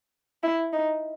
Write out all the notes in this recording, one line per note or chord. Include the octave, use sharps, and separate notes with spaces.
E4
D#4